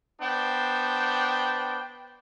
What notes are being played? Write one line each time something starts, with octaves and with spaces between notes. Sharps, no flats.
B3 D4 C5 G5